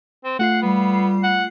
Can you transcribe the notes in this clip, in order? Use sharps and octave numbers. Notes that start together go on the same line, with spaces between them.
C4
A3 F4 F#5 C7
G3 B3
F#5